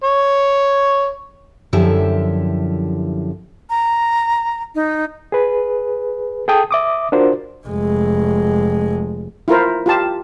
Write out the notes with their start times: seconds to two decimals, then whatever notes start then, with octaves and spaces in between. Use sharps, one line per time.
0.04 C#5
1.73 F#2 D3 F3 E4 G4 E5
3.70 A#5
4.75 D#4
5.32 G#4 B4
6.48 G#4 A4 G5 A5 D#6
6.71 E5 D6 D#6
7.12 D4 F4 F#4 A#4 C5
7.68 F1 G#3
9.48 E4 F4 A#4 C5
9.86 F4 G4 A5